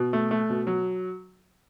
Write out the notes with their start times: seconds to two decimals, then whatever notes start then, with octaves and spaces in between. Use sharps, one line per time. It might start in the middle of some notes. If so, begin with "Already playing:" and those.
Already playing: B2
0.13 A3
0.31 A3
0.50 B2
0.67 F#3